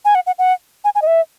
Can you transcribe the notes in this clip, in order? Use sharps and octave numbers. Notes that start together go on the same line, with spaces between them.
G#5
F#5
F#5
F#5
G#5
G#5
D#5
E5